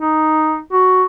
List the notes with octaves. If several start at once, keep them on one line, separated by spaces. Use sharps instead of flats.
D#4
F#4